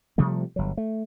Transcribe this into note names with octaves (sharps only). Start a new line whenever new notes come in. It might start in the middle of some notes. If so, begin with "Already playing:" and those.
C3 F3 G3 A3
G1 F#3
A3